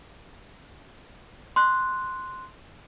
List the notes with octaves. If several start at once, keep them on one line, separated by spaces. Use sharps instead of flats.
C6 F#6